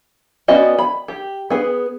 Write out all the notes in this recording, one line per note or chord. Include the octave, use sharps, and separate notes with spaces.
B3 C#4 F#4 D5 D#5
B5
G4
B3 G#4 B4